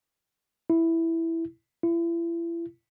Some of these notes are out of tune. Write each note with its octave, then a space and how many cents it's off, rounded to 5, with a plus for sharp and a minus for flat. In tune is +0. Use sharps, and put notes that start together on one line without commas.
E4 +0
E4 +35